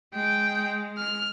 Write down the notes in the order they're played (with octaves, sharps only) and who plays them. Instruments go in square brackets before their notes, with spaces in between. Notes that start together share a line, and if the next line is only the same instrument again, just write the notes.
[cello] G#3 [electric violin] G5
[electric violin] F6